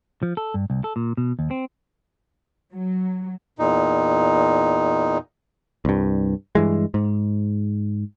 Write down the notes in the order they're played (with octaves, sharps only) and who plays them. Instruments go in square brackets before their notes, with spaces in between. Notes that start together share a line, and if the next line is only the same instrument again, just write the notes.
[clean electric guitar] F3
A4
G2
C2
A4
A#2
B2
D#2
C4
[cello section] F#3
[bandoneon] E2 A#2 D#4
[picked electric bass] C2 G2
G2 E3 G#3
G#2